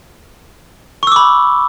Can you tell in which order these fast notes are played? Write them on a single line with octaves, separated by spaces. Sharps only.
C#6 E6 D6 B5